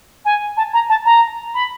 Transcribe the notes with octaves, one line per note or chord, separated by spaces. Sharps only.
G#5
A5
A#5
A5
A#5
B5